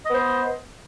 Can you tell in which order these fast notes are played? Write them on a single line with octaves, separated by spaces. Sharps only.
D#5 B3 C5